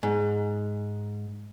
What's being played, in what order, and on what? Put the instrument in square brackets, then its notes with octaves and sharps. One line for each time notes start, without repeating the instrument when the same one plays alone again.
[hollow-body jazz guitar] G#2